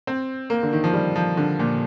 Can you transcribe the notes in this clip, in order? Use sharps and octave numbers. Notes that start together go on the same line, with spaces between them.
C4
A#3
D3
D#3
F3
G3
F3
D3
A#2